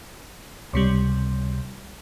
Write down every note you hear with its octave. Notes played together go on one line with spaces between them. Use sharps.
C#2 C3 G3